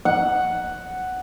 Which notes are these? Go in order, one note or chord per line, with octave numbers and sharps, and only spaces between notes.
F#5